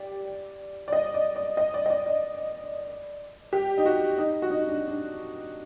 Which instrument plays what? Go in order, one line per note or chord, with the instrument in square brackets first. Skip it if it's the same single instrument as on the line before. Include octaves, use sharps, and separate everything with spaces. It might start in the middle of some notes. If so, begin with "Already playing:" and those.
Already playing: [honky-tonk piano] G4 D5
D5
D#5
D5
D5
D#5
D5
D#5
D5
D5
G4
D#4
F#4
D#4
F#4
D#4
D4
D4